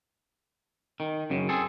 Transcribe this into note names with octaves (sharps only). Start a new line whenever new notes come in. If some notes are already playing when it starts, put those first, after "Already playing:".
D#3
F#2 C#3
C4 G#4 A4